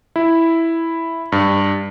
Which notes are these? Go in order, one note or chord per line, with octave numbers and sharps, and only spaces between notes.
E4
G2